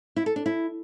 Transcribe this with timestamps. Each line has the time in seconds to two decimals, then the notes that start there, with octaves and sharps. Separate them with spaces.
0.16 E4
0.26 A4
0.36 D4
0.46 E4